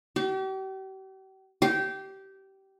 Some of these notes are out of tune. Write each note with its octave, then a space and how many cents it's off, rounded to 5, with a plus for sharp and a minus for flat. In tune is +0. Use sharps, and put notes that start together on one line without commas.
G4 -40
G4 -20